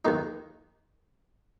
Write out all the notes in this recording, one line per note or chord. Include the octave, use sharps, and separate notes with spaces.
D#2 D#3 A#3 D#4